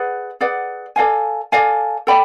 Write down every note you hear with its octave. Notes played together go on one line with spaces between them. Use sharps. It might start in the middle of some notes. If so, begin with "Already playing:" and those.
Already playing: G#4 B4 D5 F#5
G#4 B4 D5 F#5
A4 D5 F5 G#5
A4 D5 F5 G#5
A4 D5 G5 B5